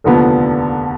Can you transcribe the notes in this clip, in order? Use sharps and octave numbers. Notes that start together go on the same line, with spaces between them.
F1 D#2 D3 F3 B3